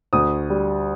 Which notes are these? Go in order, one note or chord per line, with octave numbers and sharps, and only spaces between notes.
D2 D#6
G3